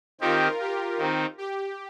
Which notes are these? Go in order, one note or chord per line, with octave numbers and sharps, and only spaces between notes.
D#3 C4 D#4 F4 G4 A#4
G4
D#3 C4 D#4
G4